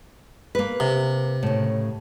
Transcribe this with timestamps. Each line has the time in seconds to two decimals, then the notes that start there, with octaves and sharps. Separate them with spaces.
0.55 A#3 B4
0.80 C3
1.43 A2 C#3